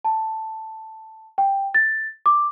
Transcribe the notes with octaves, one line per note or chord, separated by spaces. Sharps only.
A5
G5
A6
D6